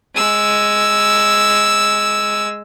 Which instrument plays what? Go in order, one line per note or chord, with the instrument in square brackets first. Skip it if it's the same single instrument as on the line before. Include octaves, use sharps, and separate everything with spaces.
[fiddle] G#3 E6